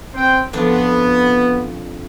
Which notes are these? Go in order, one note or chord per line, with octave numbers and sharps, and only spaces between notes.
C4 C5 G5
F2 B3 D4 F4